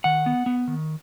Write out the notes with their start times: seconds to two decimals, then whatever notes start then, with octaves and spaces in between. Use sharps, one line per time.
0.04 D#3 F#5
0.26 B3
0.46 B3
0.68 D#3